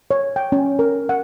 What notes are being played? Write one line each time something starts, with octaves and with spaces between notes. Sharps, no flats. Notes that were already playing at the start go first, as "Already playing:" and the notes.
C#5
G5
C#4
A#4
F#5